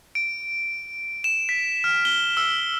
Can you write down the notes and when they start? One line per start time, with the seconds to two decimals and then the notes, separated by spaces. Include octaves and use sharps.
0.15 D7
1.24 E7
1.49 B6
1.84 F6
2.05 G7
2.37 E6